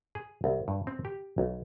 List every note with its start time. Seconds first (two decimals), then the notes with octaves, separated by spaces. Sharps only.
0.15 G#4
0.44 C2
0.68 G2
0.87 C4
1.05 G4
1.38 B1